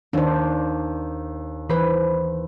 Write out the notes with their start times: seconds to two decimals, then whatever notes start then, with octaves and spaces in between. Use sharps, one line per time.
0.13 D#2 D4 C5
1.70 E3 B4 C5 B5